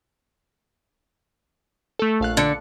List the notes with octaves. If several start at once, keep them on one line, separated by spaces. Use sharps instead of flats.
A3 A4
A#1 F5 F#6
D3 A6 C#7